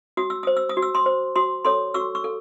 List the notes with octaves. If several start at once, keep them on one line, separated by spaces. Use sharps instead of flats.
F#4 D#6
E6
C5 D#6
E6
D#6
F#4
E6
C6 D#6
C5
F#4 C6 D#6
A4 C#5 C6 D#6
F#4 C#6 E6
C#6 E6
A4